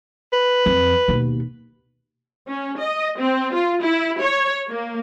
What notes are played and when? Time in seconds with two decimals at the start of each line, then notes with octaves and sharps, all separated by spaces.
0.33 B4
0.66 F2
1.08 D#2 B2
2.49 C#4
2.79 D#5
3.19 C4
3.54 F4
3.82 E4
4.21 C#5
4.69 A#3